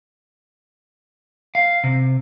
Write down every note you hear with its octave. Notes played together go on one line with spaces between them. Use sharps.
F5
C3